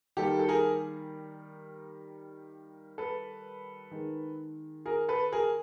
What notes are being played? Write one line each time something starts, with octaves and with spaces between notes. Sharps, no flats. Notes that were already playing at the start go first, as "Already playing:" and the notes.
D#3 G3 A#3 G4 A4
A4
G#4 A#4
A4 B4
D#3 G#3
G#4 A#4
A4 B4
G#4 A#4